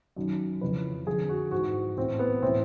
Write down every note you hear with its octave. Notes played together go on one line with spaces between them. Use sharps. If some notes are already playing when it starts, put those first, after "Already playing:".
F#2 D#3
F2 C#3 E3 B4
F2 D3 G#4
F#4
G#2 E3 F#4
A2 E3 C4
B3
A2 E3 C4